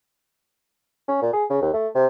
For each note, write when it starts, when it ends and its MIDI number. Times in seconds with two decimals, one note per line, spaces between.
1.08 1.17 61
1.22 1.30 46
1.33 1.44 68
1.50 1.61 49
1.62 1.72 39
1.74 1.88 57
1.95 2.06 48